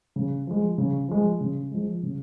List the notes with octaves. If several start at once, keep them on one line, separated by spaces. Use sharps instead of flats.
C#3
F3 G#3
C#3
F3 G#3
C#3
F3 G#3
C#3